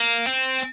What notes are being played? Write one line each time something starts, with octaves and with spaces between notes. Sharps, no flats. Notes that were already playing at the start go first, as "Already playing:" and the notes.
Already playing: A#3
C4